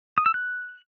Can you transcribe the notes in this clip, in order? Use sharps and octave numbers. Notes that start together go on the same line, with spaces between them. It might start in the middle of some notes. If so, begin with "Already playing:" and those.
D#6
E6
F#6